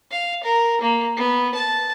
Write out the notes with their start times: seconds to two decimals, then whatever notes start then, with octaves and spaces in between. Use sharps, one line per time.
0.11 F5
0.44 A#4
0.81 A#3
1.17 B3
1.55 A5